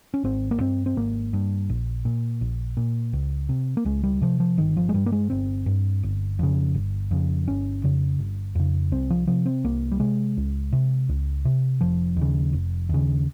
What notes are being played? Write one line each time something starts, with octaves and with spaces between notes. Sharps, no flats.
C#4
G#1 C4
A#3
G2 C4
C4
G#1 A#3
G2
A#1
A#2
A#1
A#2
C#2
C3
A#3
C#2 G#3
G3
C3 F3
F3
G1 D#3
F3
G#3
G2 G3
A#3
G#3
G1 C4
G2
G1
F2 C#3
G1
F2 C#3
G1 C#4
F2 C#3
G1
F2 C#3
C2 C4
F3
C3 F3
C4
C2 A#3
G3
C3 G#3
C#2
C3
C#2
C3
F1 F3
D#2 C#3
F1
D#2 C#3